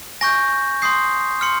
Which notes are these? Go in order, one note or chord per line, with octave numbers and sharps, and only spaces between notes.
G#5 C#6 G6 A#6
C6 D#6 G6 C7
C6 F6 C#7